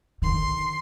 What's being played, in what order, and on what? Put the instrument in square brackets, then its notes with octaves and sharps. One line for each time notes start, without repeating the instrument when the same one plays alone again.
[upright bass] D3 D#3 [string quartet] C6